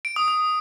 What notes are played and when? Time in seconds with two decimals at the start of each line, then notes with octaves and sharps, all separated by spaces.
0.05 D7
0.16 D#6
0.28 D#6